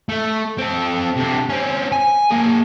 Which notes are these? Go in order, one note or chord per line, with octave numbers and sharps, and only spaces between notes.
A3
C4 A4
C3 D4
C4 C#4
G#5
A#3 G#4